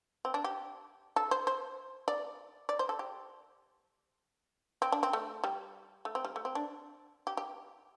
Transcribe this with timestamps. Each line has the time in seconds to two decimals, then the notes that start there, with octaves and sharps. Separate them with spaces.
0.25 C4
0.34 D4
0.44 G4
1.16 A4
1.31 C5
1.47 C5
2.08 D5
2.69 D5
2.79 C5
2.89 A4
2.99 G4
4.82 C4
4.92 D4
5.03 C4
5.13 A3
5.44 G3
6.05 A3
6.15 C4
6.25 G3
6.36 A3
6.45 C4
6.55 D4
7.27 G4
7.37 G4